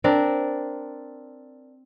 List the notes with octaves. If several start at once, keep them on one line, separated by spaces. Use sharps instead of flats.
C4 D4 A#4